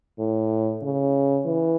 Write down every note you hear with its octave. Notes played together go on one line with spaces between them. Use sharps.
A2
C#3
E3